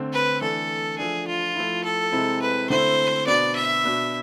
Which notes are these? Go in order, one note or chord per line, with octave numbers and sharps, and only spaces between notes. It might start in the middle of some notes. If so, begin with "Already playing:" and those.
Already playing: D3 A3 C4
B4
E3 A3 D4 A4
F3 A3 D4 G#4
F4
F3 A3 E4
A4
C3 G#3 C4 E4
B4
D3 A3 C4 E4 C5
B2 B3 D4 D5
E5
B2 B3 D4